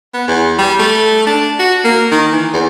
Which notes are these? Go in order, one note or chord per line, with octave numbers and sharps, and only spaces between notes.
B3
E2
G3
A3
D4
F#4
A#3
D#3
E3
E2